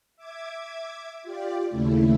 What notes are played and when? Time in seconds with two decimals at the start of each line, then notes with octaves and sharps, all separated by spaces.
0.16 E5 D6 G#6
1.23 F4 G4 D5
1.68 D#2 C#3 A3 E4